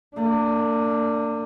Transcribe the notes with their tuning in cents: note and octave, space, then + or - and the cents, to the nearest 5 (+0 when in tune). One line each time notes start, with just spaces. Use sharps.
A#3 -40 D4 +0